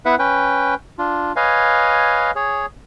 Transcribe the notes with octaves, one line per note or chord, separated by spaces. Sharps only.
B3 E4 B4 E5 F#5
C#4 B4 G5
D4 F4
B4 C#5 D#5 F5 G#5
G#4 C#5